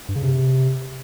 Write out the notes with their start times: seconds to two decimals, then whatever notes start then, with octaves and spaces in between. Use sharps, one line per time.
0.09 G2
0.16 C#3
0.23 C3